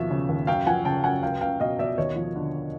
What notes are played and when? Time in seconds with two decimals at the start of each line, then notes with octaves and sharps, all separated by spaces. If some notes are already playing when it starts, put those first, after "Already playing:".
Already playing: D#2 B2 F3 E5
0.11 C#3
0.29 D#2
0.47 F#2 F5 G5
0.66 F3 F#5 G#5
0.85 C#3 G5 A5
1.03 F#2 F#5 G#5
1.23 C#2 F5 G5
1.41 C#2 F5 G5
1.60 B2 D#5 F5
1.79 B2 D5 E5
1.97 D#2 C#5 D#5
2.16 F3
2.36 D3